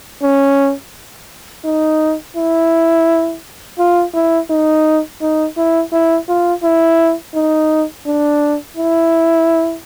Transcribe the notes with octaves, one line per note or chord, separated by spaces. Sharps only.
C#4
D#4
E4
F4
E4
D#4
D#4
E4
E4
F4
E4
D#4
D4
E4